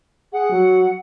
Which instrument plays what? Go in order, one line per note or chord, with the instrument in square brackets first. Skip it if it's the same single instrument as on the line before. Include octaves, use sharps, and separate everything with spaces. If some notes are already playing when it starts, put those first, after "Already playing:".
[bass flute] G#4 [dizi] F#5
[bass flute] F#3